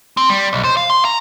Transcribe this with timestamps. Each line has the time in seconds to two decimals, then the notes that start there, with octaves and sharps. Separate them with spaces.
0.17 C4
0.30 G3
0.53 B1
0.64 C5
0.77 F5
0.90 C6
1.05 A#5